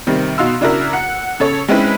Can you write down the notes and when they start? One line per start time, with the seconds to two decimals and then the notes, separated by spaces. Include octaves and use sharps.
0.07 C3 D#3 G3 C4
0.38 B2 D#4 F#4 F5 C6 E6
0.61 C#3 D4 E4 F#4 A#4
0.93 F#5
1.40 C#3 A4 C#5
1.68 G#3 C4 C#4 D#4 E4 B4